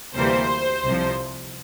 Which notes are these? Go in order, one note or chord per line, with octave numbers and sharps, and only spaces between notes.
D2 C3 E3 G3 A#3 C5
C2 C3 F3